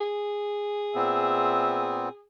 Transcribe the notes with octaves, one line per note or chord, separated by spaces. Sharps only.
G#4
A#2 B3 C4 E5